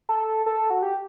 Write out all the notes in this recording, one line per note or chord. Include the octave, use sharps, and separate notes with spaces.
A4
A4
F#4
G4